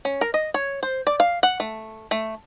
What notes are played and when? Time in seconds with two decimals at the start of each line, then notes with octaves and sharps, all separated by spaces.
0.05 C#4
0.21 A#4
0.34 D#5
0.54 C#5
0.83 C5
1.07 D5
1.20 F5
1.43 F#5
1.60 A3
2.11 A3